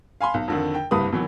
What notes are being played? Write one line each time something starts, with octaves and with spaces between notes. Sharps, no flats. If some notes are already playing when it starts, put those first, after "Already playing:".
F5 G#5 B5 C6
B1
F2 D3 D#3
G5
F#1 C2 G2 B4 D#6
B2 D#3 E3 F#3